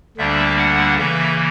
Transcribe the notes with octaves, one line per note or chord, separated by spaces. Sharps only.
D2 D3 G3 A#3 D4 E5
F#5
C#3 E3 A#3 E5